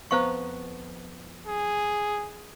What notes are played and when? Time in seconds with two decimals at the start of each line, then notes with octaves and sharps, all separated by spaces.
0.11 F2 B3 C5 F5 A#5 C#6
1.47 G#4